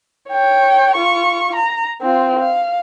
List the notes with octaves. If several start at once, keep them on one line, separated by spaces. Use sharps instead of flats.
C#5 G5
F4 C#6
A#5
C4 F4
F5